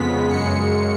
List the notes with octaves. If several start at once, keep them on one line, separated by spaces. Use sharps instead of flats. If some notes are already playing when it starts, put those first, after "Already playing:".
Already playing: F2 C#3 G#3 B3 B6
F#2 C#3 G#3 C#7